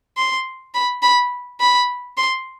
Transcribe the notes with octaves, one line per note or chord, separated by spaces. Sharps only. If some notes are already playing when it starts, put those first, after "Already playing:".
C6
B5
B5
B5
C6